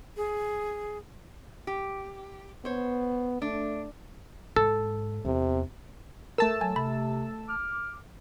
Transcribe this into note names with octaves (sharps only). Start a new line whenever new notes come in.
G#4
G4
B3 C5 C#5
A3 D4
G#2 A4
E2 C3 B3
A3 A#4 A5 E6
F#3 G#5
C3 B5
D6 F6